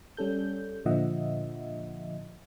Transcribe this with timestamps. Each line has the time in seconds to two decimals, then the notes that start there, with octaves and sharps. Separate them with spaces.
0.17 G3 C#4 A4 G6
0.85 A#2 D3 F3 D#5 E5 F#5